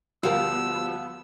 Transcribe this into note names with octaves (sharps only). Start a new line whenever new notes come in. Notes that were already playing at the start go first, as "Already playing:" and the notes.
D2 F3 G3 B3 A#4 F5 E6